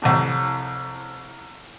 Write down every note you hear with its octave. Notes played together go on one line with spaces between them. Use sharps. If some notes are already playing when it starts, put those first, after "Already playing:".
C2 F2 A2